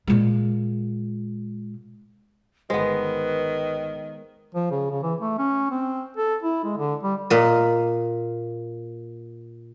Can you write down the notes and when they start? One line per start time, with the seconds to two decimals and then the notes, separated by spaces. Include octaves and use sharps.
0.07 A#2 G#3
2.70 G1 D#3 G#3 B3 B4 C5
4.55 F3
4.71 C#3
4.91 C#3
5.03 E3
5.21 A3
5.38 C#4
5.71 C4
6.17 A4
6.43 E4
6.64 G#3
6.77 D3
7.03 G3
7.30 A#2 D#5